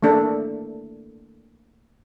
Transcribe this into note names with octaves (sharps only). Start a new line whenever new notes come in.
A3 A#3 D4 A4